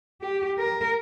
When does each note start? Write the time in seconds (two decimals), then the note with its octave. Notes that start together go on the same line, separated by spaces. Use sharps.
0.22 G4
0.58 A#4